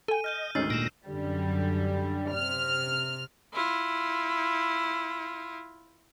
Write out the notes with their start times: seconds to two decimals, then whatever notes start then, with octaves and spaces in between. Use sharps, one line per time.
0.08 A4 G5 G#5 D#7
0.24 D#5 F6 G6 D#7
0.55 D2 G#2 D#3 C#4 D#4 E6 A6 C7
0.70 A#2 A#6 D7 E7
1.06 F#2 D3 G3
2.31 C3 F6
3.53 E4 F4